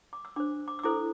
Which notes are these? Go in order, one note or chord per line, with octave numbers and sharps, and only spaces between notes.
D6
E6
D4 C5 D6
D6
E6
E4 A4 C5 D6